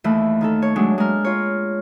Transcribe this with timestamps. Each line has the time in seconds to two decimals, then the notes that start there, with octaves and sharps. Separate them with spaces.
0.04 D#2 E3 A3
0.41 D#3 D#4 A4
0.62 C#5
0.76 F#3 G#3 A3 D4
0.98 G#3 A#4
1.24 F4 C#5